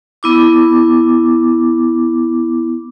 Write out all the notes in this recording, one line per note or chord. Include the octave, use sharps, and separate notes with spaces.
B3 E4 D6